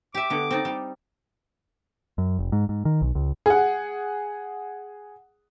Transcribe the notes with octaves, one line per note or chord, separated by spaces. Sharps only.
G4 E5 D6
D3 B3
C4 D#4 D5
G3
F#2
F1
G#2
G#2
D#3
B1
C#2
G#4 F#5